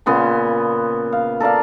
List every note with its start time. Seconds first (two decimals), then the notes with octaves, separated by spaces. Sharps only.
0.06 A#2 C#3 B3 C6
1.13 F5
1.40 A4 A#4 D5 F5